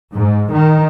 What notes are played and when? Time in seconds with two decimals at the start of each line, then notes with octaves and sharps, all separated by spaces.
0.14 G#2
0.52 D#3